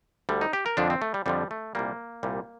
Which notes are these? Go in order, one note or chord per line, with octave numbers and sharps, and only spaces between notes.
D2 D3 G3
D#4
G4
A#4
F2 D3 F3 D4
C4
A3
G3
F2 D3 F3 G3
A3
C2 A#2 G3 A#3
C2 A#2 G3